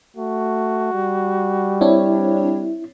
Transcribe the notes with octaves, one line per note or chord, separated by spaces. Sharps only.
A3 F#4
G3
C4 D4 E4 C#5